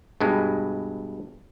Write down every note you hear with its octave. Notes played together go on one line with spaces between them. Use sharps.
G2 B2 G#3